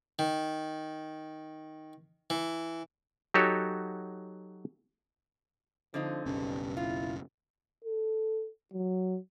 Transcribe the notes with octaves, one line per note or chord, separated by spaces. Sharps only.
D#3
E3
F#3 D#4 F#4 G4 A4 C#5
D3 F3 C4 D#4
F#1 B1 G2 C#4
E4 F4
A4
F#3